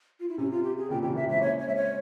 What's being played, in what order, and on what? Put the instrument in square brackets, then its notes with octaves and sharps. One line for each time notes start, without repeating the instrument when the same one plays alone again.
[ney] F4
E4
[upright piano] C3 [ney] C#4
[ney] F4
G4
G#4
[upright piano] A#2 C#3 [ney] G5
[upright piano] C3 E3 [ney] G5
[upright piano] C3 E3 [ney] E5
[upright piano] G#3 C4 [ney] E5
[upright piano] A#3 C#4 [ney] C#5
[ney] C#5
[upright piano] G#3 C4 [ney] E5
[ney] C#5